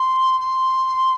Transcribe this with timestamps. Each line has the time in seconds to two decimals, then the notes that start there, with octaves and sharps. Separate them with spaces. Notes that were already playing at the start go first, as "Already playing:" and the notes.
Already playing: C6
0.40 C6